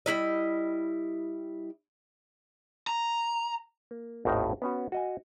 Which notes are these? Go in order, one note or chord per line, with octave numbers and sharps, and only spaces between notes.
G3 G#3 E4 D#5
A#5
A#3
G#1 D#2 A2 D#4 A#4 F#5
B3 C#4 F#4
F#4 D#5 G#5